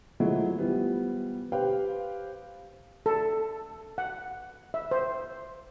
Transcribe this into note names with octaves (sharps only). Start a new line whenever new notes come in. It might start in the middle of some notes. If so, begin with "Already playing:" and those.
F3 F#3 G#3 A3 E4
E3 F3 G3 B3
G4 B4 C5 F5 G5
A4
F#5
E5
C5